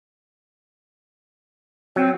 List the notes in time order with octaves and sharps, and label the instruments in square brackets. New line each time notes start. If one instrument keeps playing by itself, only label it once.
[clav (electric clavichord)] F#3 [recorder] C4